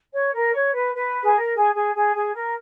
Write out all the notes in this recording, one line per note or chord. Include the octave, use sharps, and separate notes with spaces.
C#5
A#4
C#5
B4
B4
G#4
A#4
G#4
G#4
G#4
G#4
A#4